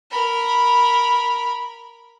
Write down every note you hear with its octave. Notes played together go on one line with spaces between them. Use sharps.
A#4 B5